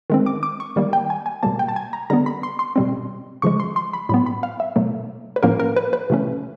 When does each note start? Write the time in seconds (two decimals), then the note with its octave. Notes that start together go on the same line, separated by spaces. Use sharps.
0.10 D#3 G#3 C4
0.26 D6
0.43 D6
0.60 C#6
0.76 D#3 G3 A#3
0.93 G5
1.10 G#5
1.26 G#5
1.43 B2 G3 A#3 A5
1.59 G5
1.68 A5
1.76 G#5
1.93 A#5
2.10 D3 G3 B3 A#5
2.26 B5
2.43 C6
2.59 C6
2.76 B2 G3 C4
3.42 C#3 F3 G#3 C#6
3.60 C6
3.76 C6
3.93 B5
4.09 A2 F#3 B3 B5
4.26 B5
4.43 F5
4.60 E5
4.76 B2 F#3 A3
5.36 B4
5.43 A2 F3 A#3 C#4 A#4
5.60 A#4
5.76 B4
5.93 B4
6.10 C3 E3 A3 C#4